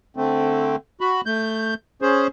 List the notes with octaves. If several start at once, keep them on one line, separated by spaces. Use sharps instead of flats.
D3 A3 C4
F#4 B5
A3 G6
C#4 G#4 C5